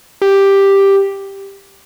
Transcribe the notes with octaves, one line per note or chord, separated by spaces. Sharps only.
G4